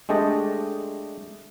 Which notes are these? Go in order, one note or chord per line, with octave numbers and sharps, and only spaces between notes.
G#3 A3 D4 G4 D5 D#5